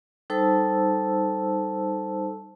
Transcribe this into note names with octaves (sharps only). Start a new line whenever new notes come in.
G3 D#4 A4 C5 A5 E6